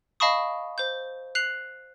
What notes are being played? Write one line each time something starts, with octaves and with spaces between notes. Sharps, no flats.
D#5 F5 A5 B5 C#6 D#6
C5 G6
F#6 C7 F7 F#7